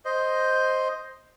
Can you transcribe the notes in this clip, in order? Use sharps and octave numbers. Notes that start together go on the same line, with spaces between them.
C5 D#5